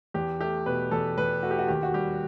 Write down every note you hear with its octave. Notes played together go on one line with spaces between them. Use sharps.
E2 G4
A3 G4
B2 B4
E2 A4
E2 B4
A3 F#4
G4
F#4
D#2 G4
F#4
G3 G4